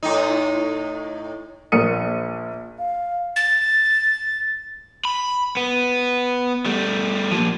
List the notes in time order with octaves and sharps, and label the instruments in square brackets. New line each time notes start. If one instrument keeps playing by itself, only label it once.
[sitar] A2 D#4
[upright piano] A#1 A#4 D#6 C#7 D#7
[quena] F5
[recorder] A6
[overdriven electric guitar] B5
B3
G3 A3
F3 A#3